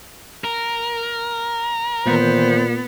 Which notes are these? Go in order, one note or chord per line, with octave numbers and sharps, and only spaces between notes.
A#4
A#2 D#3 E3 B3 C5